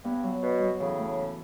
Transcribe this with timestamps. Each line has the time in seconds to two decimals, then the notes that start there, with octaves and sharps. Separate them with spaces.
0.04 G2 B3
0.23 F#3
0.42 B2 F#4
0.62 F#3
0.80 A2 C#3 E3
0.99 A3
1.19 E4